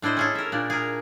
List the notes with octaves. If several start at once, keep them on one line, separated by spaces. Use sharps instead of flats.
A2 D4 E4 C5 D#5
C#4 G#4 A4
A#4 E5
A#2 D4
G#4 A#4